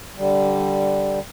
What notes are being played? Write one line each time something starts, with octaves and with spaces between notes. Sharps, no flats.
D3 G3